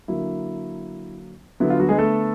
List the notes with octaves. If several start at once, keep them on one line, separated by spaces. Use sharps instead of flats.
D3 F#3 A#3 E4
D3 F#3 B3 E4
F4
F#3 F#4
G#3 G#4
A3 A4